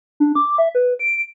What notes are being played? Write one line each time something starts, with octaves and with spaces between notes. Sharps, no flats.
D4
D6
E5
B4
D7